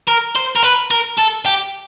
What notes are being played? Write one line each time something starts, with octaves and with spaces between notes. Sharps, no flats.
A#4
C5
A#4
B4
A#4
A4
G4